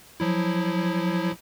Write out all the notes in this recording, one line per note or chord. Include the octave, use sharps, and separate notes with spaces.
F3 F#3 E4